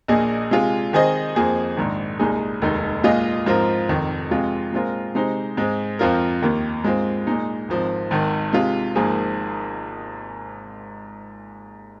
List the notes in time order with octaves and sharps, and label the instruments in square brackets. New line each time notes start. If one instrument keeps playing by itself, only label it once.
[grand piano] A#1 A#2 A#3 G#4 D#5
C3 G#3 F4 G#4
D#3 C4 G#4 C5 D#5
F2 F3 A#3 G#4 C5
A#1 G#2 D#3
C2 A#2 G#3 D#4 G#4
F1 D#2 D#3 G#3 D#4
A#2 G#3 F4 G#4 D#5
G#2 F3 C4 F4 A#4
F1 F2 D#3
F2 C3 G#3 F4
A#2 G#3 C4 F4 A#4
C3 G#3 D#4 C5
G#2 G#3 C4
F2 F3 C4 F4 A#4
D#2 D#3 A#3
G#2 G#3 C4 F4
A#2 G#3 D#4
G#1 G#2 F3 C4
G#1 G#2 D#3
C3 G#3 F4
G#1 G#2 F3 A#3 G#4